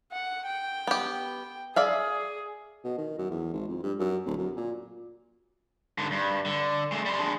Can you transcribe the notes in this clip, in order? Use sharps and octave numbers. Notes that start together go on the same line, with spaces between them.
F#5
G5
B3 G4
G#4 D5 E5 F5
B2
D#3
F#2
E2
G#1
F2
G2
F#2
D1
F#2
A#2
G#2 D3
G2
D3
G#3 A3
G3 C6
D4 G#4